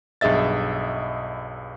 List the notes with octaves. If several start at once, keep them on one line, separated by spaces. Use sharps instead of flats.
B1 G2 G#4 D#5 E5 A6